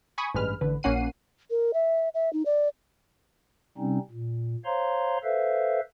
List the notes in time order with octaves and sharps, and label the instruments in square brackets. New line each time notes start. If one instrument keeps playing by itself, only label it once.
[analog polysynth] G#5 B5 C#6 D#6
A1 G2 G#3 B4 F6
A1 D3 B4
A#1 A#3 C#4 F#5 C7 D#7
[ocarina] A#4
E5
E5
D#4
D5
[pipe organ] C3 G3 C4 C#4 D#4
A#2
C5 C#5 F5 A#5 C6
A4 B4 C5 E5 F5